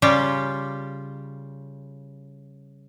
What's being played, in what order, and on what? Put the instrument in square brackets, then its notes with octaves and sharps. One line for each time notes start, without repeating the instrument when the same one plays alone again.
[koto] C#3 G3 F4 G4